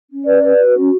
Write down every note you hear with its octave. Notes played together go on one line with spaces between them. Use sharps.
C#4
B4 D5
B4
F#4
C#4